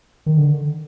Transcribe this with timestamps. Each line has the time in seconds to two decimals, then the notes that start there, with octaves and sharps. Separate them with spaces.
0.26 D#3
0.37 D3